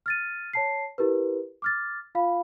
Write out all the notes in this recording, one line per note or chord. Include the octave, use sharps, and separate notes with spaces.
F6 A6 D#7
C#5 A5 C7
E4 G4 A#4 B4
D6 F6 A6
F4 F5 B5